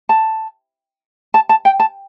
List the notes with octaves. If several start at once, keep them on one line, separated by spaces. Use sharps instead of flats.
A5
A5
A5
G5
A5